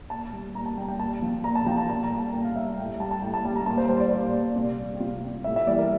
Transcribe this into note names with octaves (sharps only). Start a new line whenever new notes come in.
A#2 A5
G3
A#2 A#5
A5
G3 G5
G5
A#2 A5
F3
A#2 A#5
A5
F3 G5
A5
A#2 A5
A#5
G3
A5
A#2 G5
F5
G3 E5
F5
A2 G5
G3 A5
A5
A2 G5
A5
G3 A5
A#5
A#2 A5
C5
G3 C5
D5
A#2
G3
C3 D5
G3
G4
C3 F4
G3
A2 E5
E5
E3 G3 D5
A#4